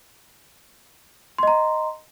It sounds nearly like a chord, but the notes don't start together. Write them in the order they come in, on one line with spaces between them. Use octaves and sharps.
C6 D#5 A#5